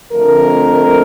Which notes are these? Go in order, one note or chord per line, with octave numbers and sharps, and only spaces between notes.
F2 D3 A3 A#4